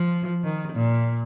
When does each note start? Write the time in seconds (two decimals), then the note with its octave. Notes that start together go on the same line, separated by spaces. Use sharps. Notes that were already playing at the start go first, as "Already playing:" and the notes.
Already playing: F3
0.44 D#3
0.73 A#2